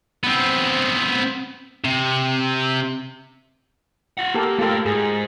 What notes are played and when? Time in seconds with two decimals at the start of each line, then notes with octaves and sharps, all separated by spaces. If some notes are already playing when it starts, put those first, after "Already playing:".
0.24 B3 C4
1.85 C3
4.18 F4 F#5
4.34 A#3 G4 A4 A#4
4.59 A3 F4 A4 A#4 G5
4.86 G#2 G#4